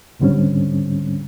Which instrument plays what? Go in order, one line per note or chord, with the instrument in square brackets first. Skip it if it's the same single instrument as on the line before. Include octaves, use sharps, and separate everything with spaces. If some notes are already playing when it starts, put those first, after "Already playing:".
[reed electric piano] C#2 G#2 D3 G3 C4 C#4